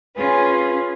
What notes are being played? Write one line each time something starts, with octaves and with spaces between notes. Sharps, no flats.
C#4 F4 G#4 B4